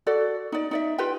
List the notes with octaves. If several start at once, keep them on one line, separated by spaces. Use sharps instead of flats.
F#4 A4 D5
D#4 D5
D#4 D5 E5
F4 G4 B4 G5